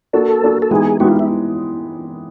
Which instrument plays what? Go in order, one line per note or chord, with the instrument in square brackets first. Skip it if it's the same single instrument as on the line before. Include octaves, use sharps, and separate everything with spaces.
[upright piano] A#3 D4 F#4 [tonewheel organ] A4
[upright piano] A#3 D4 F#4
[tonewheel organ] A4
[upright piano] E3 G#3 B3 D#4 G4 [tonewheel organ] G#4
[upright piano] E3 G#3 B3 D#4 G4 [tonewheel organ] F#4
[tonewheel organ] F4
E4